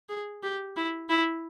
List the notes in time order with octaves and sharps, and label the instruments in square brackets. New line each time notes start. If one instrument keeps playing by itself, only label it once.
[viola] G#4
G4
E4
E4